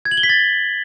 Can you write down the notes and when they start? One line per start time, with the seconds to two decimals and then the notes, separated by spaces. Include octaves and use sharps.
0.05 G#6
0.11 F#7
0.17 G7
0.23 B6
0.29 A6